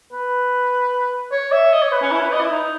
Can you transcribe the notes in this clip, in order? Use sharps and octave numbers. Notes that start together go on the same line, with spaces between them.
B4
C#5
E5
D#5
C#5
B4
C#4
E4
B4
D#5
E4
D#4